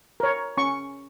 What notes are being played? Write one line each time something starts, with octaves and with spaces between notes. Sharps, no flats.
A#4 C#5
C#4 C#6